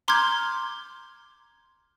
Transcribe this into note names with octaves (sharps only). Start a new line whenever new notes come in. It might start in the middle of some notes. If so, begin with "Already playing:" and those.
A#5 C6 D6 F6 G6 G#6